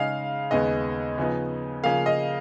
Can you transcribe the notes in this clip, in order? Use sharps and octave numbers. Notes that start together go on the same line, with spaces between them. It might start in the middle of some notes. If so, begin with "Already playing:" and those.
Already playing: C#3 G#3 D#4 F5
D#2 C#3 G#3 B3 D#4 D#5
C#3 F3 B3 D#4
C#3 F3 A#3 F5
D#5